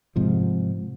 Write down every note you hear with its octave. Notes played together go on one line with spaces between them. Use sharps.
G#2 C3 F3